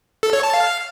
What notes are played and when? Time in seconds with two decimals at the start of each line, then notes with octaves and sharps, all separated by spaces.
0.23 A4
0.33 C#5
0.43 A5
0.54 F5